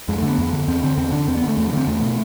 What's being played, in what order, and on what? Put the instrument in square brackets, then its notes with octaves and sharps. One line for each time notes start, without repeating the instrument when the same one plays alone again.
[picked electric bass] F2 G#3
A3
D3
B3
F2
D3
E2 C4
D3 C4
E2 C4
D3 D4
E2 C4
B3
D3 A3
E2 A3
F3
D3 C4
E2 A3
B2